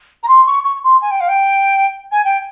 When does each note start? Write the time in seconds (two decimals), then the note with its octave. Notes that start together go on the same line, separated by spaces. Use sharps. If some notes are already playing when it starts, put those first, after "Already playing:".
0.23 A#5
0.28 C6
0.47 C#6
0.64 C#6
0.84 C6
1.01 G#5
1.10 G5
1.20 F5
1.28 G5
2.11 G#5
2.24 G5